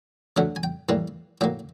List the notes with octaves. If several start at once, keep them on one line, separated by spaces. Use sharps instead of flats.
D2 D3 F#3 A3 F#5
G#5
G5
A2 E3 G3 A#3
A2 F#3 A#3 G5